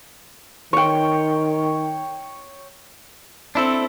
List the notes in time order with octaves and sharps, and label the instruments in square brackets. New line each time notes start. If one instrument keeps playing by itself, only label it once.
[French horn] D#3 [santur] C#5 G5
[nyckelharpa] C4 [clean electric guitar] D4 E4 A4